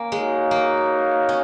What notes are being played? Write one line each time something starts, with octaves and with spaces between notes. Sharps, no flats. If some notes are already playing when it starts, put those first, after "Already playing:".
Already playing: A#3 C#4
G#3 D#4 F#4 C#5 F5
A#3
C#4